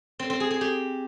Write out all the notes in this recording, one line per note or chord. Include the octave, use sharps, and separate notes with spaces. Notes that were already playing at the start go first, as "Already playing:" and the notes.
C4
C4
G#4
G#4
G4